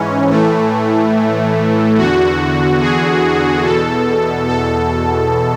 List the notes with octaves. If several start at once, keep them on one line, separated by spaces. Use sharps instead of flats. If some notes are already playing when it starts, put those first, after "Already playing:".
Already playing: G#2 E3 C#4
A2 E3 A3
E2 D3 F#4
G#4
E2 B2 A4
A4